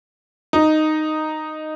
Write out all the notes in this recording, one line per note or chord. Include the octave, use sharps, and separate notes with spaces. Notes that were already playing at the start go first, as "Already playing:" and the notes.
D#4